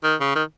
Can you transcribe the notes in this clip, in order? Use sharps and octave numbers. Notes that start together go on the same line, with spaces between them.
D#3
C#3
D#3